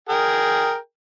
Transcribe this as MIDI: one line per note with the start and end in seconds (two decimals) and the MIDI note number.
0.09 0.76 68
0.09 0.76 70
0.09 0.76 79